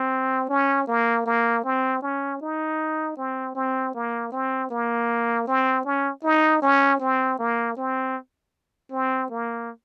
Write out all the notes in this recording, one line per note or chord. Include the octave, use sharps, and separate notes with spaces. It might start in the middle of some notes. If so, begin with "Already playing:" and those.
Already playing: C4
C#4
A#3
A#3
C4
C#4
D#4
C4
C4
A#3
C4
A#3
C4
C#4
D#4
C#4
C4
A#3
C4
C4
A#3